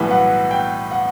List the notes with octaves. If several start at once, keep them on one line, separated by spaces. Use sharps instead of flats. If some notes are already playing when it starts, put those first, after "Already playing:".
Already playing: B1 A2 E3 G3 B3 E5
F#5
G5
F#5